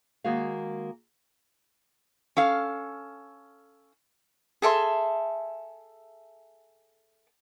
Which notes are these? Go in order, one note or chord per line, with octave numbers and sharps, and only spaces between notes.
D#3 G#3 A#3 F#4 G#4 F5
C#4 A4 F5
G#4 A4 E5 C6